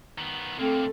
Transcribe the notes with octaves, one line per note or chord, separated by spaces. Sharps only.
D#3 B3
D3 A3 A#3 C4 A4